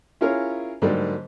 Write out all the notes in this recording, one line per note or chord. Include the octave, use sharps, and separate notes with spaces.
C#4 E4 F4 G#4 A#4 C#5
G#2 D3 F#3 G3 A#3